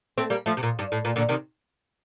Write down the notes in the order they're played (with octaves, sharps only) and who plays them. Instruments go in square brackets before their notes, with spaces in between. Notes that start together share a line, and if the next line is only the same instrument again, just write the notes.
[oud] A3 C4
G3 A#3
F3 A3
C3
A#2
G2
A2
A#2
A#2 D3
C3 D#3